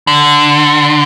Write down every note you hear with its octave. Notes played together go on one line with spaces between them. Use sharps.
D3